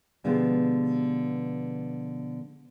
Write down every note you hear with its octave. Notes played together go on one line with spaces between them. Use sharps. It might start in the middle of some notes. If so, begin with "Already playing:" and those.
B2 D3 F3 G#3 B3 G4